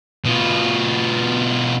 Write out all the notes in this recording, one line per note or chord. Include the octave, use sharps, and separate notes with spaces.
B2 F4